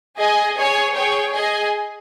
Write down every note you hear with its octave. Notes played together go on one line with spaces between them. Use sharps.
G#4 D#5 G#5
G#4 C#5 G#5
G#4 C#5 G5
G#4 D#5 G#5